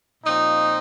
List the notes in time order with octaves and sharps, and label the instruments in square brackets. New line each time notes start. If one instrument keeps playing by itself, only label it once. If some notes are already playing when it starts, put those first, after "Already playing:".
[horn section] A#2 F3 C4 D#4